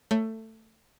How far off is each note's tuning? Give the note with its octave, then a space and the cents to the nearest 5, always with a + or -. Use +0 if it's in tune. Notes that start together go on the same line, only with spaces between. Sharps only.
A3 +15 C#5 +0